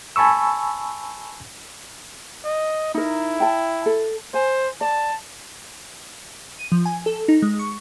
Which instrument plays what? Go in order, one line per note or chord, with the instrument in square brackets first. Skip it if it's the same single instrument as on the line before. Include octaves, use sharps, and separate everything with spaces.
[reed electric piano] G#5 A5 B5 C#6 E6
[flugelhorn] D#5
[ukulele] D#4 A#4 [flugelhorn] E4
[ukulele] G5 A5
A4
[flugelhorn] C5 [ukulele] G#5
[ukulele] D5 [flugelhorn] A5
[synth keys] D#7
F3
G#5
A4
D#4
G#3
C#6